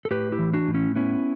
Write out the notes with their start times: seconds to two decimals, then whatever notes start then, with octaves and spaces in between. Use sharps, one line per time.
0.05 A4
0.11 A2 G4 B4
0.32 E4 G4
0.39 E3
0.54 D4 F#4
0.68 A2
0.74 C#4 E4
0.96 B3 C#4 E4